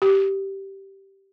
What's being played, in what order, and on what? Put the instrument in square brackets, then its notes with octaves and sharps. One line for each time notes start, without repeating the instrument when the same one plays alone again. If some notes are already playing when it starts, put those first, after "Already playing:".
[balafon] G4